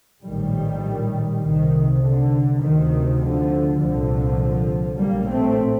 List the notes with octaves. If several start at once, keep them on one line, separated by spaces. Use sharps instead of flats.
A#1 A2 D#3 G3
C2 C3 D#3
D3
D2 C3 D#3
D3 F3
C2 A#2 D3 F3
A#1 A2 G3 A#3
A3 C4